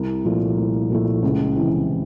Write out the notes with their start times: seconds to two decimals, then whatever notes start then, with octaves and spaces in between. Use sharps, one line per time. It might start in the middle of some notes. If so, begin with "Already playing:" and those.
Already playing: C2
0.25 A#2 F3 A3
0.57 C2
0.90 A#2 F3 A3
1.22 C#2
1.56 C3 E3